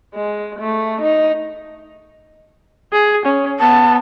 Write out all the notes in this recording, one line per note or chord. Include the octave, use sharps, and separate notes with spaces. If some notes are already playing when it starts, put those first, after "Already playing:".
G#3
A3
D#4
G#4
C#4
B3 A5